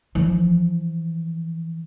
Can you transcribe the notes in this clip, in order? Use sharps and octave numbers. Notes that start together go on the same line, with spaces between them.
E3 F3